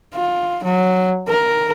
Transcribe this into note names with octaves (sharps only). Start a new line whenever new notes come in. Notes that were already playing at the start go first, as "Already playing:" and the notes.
F4
F#3
A#4